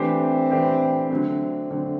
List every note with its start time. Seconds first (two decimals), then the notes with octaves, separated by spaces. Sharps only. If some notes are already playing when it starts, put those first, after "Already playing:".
Already playing: E3 A3 C4 D4 G4 C5
0.50 E3 A3 D4 G4 C5
1.10 D3 F#3 A3 C4
1.71 D3 F#3 A3